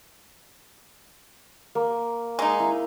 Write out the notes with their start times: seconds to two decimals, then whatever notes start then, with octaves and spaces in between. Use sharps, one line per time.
1.75 A#3
2.39 G#3 D#4
2.59 E4